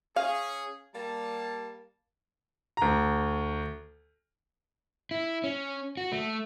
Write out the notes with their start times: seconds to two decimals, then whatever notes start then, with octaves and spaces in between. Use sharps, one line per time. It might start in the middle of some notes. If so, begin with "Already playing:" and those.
0.16 C#4 G#4 F5
0.95 G3 A#3 A5
2.77 D2 A#5
5.11 E4
5.44 C#4
5.97 F#4
6.12 A3